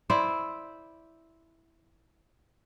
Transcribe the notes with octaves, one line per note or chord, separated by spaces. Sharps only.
E4 C5 D5